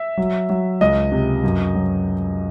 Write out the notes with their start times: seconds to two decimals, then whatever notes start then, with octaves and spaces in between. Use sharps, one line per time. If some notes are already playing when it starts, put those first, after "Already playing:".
Already playing: E5
0.17 F#3
0.49 F#3
0.81 C#2 D#5
1.12 C3
1.44 F#2
1.75 F#3